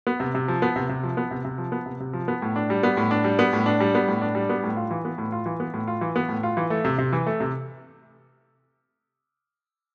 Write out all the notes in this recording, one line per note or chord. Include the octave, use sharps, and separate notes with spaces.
B3
C3
C3
F3
B3
C3
C3
F3
B3
C3
C3
F3
B3
C3
C3
F3
B3
A2
D4
G3
B3
A2
D4
G3
B3
A2
D4
G3
B3
A2
D4
G3
B3
A2
F4
E3
B3
A2
F4
E3
B3
A2
F4
E3
B3
A2
F4
E3
A3
C3
C3
E3
A3
C3